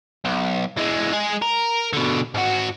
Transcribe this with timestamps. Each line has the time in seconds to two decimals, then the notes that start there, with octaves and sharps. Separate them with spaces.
0.25 B1
0.77 E3 G#3
1.12 G#3 G#4
1.42 A#4
1.93 B2 D3
2.35 G#2 F#4